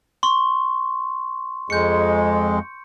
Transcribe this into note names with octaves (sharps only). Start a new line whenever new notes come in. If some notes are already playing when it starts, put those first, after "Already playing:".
C6 C#6
F2 G#3 G6 C#7